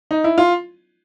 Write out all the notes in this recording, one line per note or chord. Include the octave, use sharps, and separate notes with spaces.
D#4
E4
F4